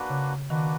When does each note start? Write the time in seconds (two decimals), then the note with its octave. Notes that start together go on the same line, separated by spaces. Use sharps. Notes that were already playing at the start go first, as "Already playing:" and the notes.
Already playing: A#3 D4 F#4 B4
0.10 C#3
0.50 D#3 A#3 D4 F#4 B4